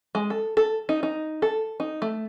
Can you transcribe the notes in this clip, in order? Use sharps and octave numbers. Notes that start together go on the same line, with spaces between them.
G#3
A4
A4
D#4
D#4
A4
D#4
A3